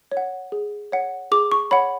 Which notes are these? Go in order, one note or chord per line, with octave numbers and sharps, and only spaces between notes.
C#5
F#5
G#4
C#5 F#5
G#4 D6
C#6
C#5 F#5 B5